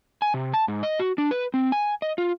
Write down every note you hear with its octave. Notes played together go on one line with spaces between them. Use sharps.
G#5
C3
A5
G#2
D#5
F#4
D4
B4
C4
G#5
D#5
F4